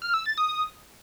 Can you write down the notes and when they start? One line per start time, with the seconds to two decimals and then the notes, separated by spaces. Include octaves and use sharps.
0.02 F6
0.14 E6
0.26 A6
0.38 D#6